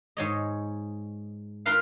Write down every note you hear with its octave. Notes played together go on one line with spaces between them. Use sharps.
G#2 C#5 D#5
F4 A#4 B4 F5